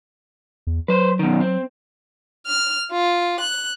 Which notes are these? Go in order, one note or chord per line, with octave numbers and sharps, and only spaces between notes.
E2
F#3 B4 C5
B2 D#3
C4
F6
F4
F#6